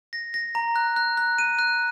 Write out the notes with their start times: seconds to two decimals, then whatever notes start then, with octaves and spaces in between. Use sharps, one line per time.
0.13 A#6
0.34 A#6
0.55 A#5
0.76 F#6
0.96 F#6
1.17 F#6
1.38 D#7
1.59 F#6